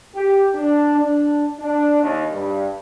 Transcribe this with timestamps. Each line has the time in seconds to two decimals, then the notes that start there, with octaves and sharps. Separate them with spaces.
0.14 G4
0.54 D4
0.97 D4
1.59 D4
2.02 D#2
2.32 G2